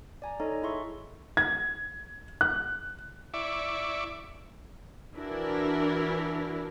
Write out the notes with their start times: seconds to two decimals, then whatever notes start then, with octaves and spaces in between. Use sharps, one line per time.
0.22 D5 G#5 A#5
0.40 D#4 A4 C#5 D#5 A#5
0.62 E4 G#4 E5 C6 C#6
1.37 G#6
2.41 F#6
3.34 E4 D5 E5 C#6 D6
5.16 E3 D4 E4 F#4 A#4